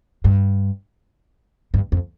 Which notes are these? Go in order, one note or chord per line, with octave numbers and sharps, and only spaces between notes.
G2
G2
F2